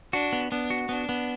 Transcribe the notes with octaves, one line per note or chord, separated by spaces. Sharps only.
D4 F#4
B3
B3 D4
F#4
B3 D4
B3